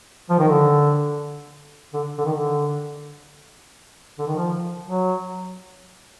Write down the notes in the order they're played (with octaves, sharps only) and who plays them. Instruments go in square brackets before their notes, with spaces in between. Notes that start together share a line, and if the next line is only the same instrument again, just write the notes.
[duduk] F3
D#3
D3
D3
D3
D#3
D3
D3
D#3
F3
F#3